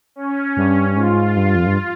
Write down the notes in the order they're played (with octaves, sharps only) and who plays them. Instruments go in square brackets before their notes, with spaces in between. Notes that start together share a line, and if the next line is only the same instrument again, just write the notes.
[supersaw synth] C#4
[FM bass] G2
[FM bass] G#2 [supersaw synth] F4
[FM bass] G2
F2
G2